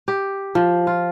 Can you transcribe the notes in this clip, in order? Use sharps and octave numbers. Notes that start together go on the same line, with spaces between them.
G4
F3
F4